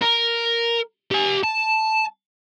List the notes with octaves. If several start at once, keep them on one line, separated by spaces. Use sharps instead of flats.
A#4
G4 G#5
A5